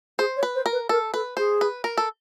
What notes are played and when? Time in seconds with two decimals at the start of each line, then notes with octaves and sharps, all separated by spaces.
0.19 G#4 C5
0.36 C#5
0.43 B4
0.55 C5
0.66 A#4
0.72 B4
0.89 A4 A#4
1.14 A4 B4
1.37 G#4 C5
1.61 B4
1.84 A#4
1.97 A4